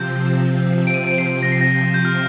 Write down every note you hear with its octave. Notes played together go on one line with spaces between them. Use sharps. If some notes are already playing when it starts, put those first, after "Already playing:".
Already playing: C3 F3 C4 G6
D7
D#7
D7
C7
A#6
C7
A#6
G6
F6